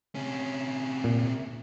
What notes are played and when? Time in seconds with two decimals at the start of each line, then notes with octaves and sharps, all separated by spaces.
0.15 C3 C#4
1.04 A#2